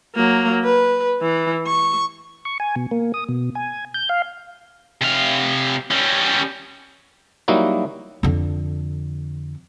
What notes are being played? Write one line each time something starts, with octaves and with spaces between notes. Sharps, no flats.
F#3 A#3
B4
E3
C#6
C#6
G#5
B2
A#3
D#6
B2
G#5
G6
F5
C3 F5
G3 C#4
F#3 G3 A#3 D#4 E4 F#4
F2 D3